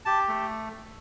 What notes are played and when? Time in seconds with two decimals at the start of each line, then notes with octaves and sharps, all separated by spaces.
0.05 G4 A5
0.28 A3